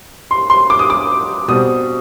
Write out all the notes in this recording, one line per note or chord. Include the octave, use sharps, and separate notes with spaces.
C6
C6
D6
D#6
D6
B2 G3 C4 D#6